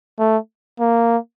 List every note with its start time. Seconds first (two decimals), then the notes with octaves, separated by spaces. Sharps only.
0.19 A3
0.80 A#3